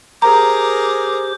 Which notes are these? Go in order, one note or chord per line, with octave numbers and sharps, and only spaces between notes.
G4 G#4 A#4 C5 A#5 D6